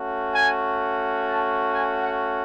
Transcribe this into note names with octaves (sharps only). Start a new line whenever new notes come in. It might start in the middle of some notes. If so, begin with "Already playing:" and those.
Already playing: A3 C#4 F#4
G#5
A5
G#5
F#5